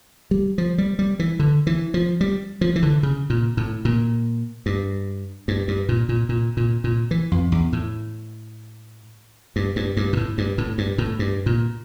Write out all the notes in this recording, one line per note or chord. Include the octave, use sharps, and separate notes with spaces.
G3
F3
G3
G3
E3
D3
E3
F3
G3
F3
E3
D3
C#3
A#2
A2
A#2
G2
G2
G2
A#2
A#2
A#2
A#2
A#2
E3
F2
E2
A2
G2
G2
G2
A#2
A2
G2
A2
G2
A2
G2
A#2